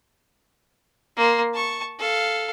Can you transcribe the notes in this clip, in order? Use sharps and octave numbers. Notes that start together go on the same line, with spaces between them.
A#3 C6
A5 C#6
A4 F5